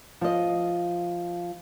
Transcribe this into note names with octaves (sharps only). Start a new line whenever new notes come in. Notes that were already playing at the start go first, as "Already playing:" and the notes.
F3 D#5